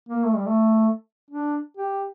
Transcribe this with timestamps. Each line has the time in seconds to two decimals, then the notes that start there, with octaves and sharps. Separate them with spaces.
0.09 A#3
0.25 A3
0.36 G3
0.46 A3
1.31 D4
1.77 G4